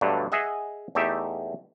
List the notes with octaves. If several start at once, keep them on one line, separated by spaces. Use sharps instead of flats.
G2 B2 D3 F#3 A3
G#4 D#5 E5 F#5
E2 A3 D#4 G4 E5